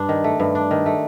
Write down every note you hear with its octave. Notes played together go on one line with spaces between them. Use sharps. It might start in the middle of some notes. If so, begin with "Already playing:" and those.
Already playing: G2 D4
D#3
A3
G2
D4
D#3
A3